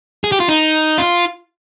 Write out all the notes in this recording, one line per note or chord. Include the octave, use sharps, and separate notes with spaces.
G#4
G4
F4
D#4
F4